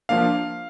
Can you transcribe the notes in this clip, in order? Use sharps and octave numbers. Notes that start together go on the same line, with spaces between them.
F3 A#3 D4 F5